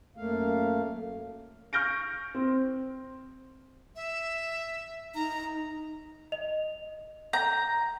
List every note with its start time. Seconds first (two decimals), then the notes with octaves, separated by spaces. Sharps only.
0.17 F#2 A3 A#3 F5
1.73 C#6 F6 G6 A#6 D7
2.35 C4
3.96 E5
5.15 D#4 A#5
6.32 D#5 F7
7.33 A#5 G6